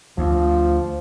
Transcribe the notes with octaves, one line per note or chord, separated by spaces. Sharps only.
D2 F3